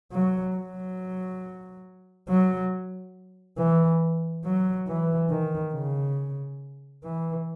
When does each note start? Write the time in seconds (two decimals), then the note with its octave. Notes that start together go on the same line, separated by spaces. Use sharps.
0.12 F#3
0.56 F#3
2.29 F#3
3.58 E3
4.45 F#3
4.87 E3
5.30 D#3
5.73 C#3
7.03 E3